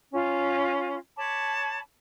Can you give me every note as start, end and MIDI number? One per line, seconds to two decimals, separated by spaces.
0.12 0.96 61
0.12 0.96 65
1.17 1.79 73
1.17 1.79 81
1.17 1.79 83
1.17 1.79 86